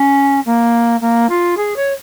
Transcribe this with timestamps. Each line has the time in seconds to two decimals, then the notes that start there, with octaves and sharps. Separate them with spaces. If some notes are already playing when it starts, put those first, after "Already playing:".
Already playing: C#4
0.46 A#3
1.01 A#3
1.29 F4
1.57 G#4
1.76 C#5